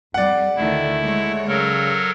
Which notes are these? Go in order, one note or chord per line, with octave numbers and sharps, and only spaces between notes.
F2 G3 D5 F#5
D2 D3 D#3 A3 E4
G#3 C#5
C#3 F#3 A4 A#4